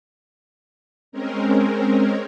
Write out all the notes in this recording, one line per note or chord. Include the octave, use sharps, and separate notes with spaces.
G#3 C4 C#4 A#4